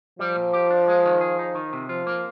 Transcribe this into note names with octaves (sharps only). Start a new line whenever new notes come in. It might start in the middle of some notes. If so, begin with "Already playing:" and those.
F3 G3
A#2
G4
D4
G#3
D#3
G#4
D#4
D#3
C3
F3 F4
A#3